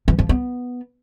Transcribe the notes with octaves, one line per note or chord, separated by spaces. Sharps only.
E3
F3
B3